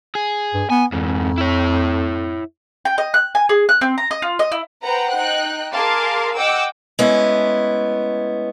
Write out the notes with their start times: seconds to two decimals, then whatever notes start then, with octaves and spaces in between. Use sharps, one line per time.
0.15 G#4
0.54 G2
0.70 B3 G#5
0.92 F2 G#2 E3
1.38 E4 C#5
2.85 G5
2.98 D#5
3.14 F#6
3.35 G#5
3.49 G#4
3.69 F#6
3.81 C4
3.98 A#5
4.11 D#5
4.22 F4
4.39 D#5
4.52 E4
4.84 B4 C5 F#5 G5 A#5
5.15 D#4 G5 F#6
5.73 G#4 A#4 F5 A5 C6 D6
6.35 D#5 F#5 G5 D6 E6
6.99 G#3 A3 B3 C#4 E4